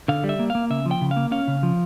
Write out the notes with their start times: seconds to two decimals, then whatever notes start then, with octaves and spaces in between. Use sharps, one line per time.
0.08 D3 F5
0.24 G3
0.29 E5
0.39 A#3
0.50 A#3 F5
0.70 C#3 E5
0.86 F3
0.91 G5
1.01 C#3
1.11 F5
1.16 A#3
1.31 C#4 F5
1.48 C#3
1.63 F3